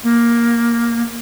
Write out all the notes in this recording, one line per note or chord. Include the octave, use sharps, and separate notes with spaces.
A#3